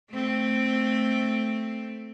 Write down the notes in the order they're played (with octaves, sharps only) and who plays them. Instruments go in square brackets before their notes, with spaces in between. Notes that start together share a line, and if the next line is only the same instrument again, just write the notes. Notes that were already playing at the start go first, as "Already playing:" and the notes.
[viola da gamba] A3 C4